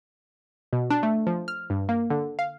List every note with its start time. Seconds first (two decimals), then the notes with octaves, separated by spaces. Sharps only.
0.73 B2
0.91 D4
1.03 A3
1.27 F3
1.48 F6
1.70 G2
1.89 A#3
2.10 D3
2.39 F5